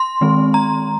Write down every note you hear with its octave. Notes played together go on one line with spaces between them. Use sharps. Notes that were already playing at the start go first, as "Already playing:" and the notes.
Already playing: C6
D#3 G#3 C4
A#5